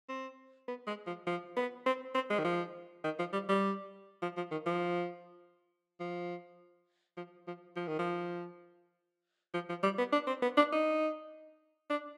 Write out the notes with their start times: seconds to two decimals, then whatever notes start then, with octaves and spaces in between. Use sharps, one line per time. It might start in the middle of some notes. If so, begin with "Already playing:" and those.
0.09 C4
0.68 B3
0.87 G#3
1.07 F3
1.27 F3
1.57 B3
1.86 C4
2.15 C4
2.30 G#3
2.39 D#3
2.45 F3
3.04 D#3
3.19 F3
3.33 G3
3.49 G3
4.22 F3
4.37 F3
4.52 D#3
4.66 F3
6.00 F3
7.17 F3
7.47 F3
7.76 F3
7.87 D#3
7.99 F3
9.54 F3
9.69 F3
9.83 G3
9.98 B3
10.12 D4
10.27 C4
10.42 B3
10.57 D4
10.72 D#4
11.90 D4